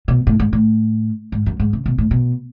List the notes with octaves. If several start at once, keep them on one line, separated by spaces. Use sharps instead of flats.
B2
A2
G#2
A2
G#2
F#2
G#2
C#3
B2
A2
B2